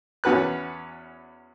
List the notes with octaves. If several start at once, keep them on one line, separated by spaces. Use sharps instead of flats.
E2 C#4 F#4 B4 F#6